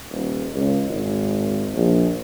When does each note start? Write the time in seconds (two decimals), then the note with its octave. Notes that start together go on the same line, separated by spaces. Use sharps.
0.11 D#1
0.54 C#2
0.88 G#1
1.75 A#1